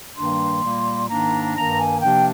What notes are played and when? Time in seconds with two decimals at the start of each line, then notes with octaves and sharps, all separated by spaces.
0.16 G2 D#3 G3 A#3 D4 C6
0.63 A#2 G3 A#3
1.09 G#2 D#3 A#3 D4 A#5
1.55 G2 D#3 A#3 D4 A#5
1.79 G#5
2.02 C3 F3 A#3 D4 G5